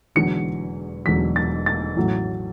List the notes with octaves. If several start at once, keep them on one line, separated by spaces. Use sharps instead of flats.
E1 E2 D3 F#3 C#7
E1 E2 D3 F#3 B6
A6
A6
A1 A2 F#3